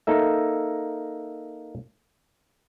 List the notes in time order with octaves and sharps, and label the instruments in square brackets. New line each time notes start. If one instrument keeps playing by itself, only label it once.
[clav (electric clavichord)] A#3 D#4 A4 E5